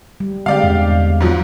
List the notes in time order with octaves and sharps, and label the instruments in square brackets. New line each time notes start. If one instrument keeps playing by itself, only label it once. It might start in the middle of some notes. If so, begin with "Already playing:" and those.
[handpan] G3
[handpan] D3 G#3 C4 [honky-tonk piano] G4 D5 F5
[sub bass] E2
[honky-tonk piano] G#2 F3 F#3